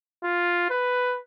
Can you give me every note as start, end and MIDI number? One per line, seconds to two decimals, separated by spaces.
0.24 0.68 65
0.70 1.19 71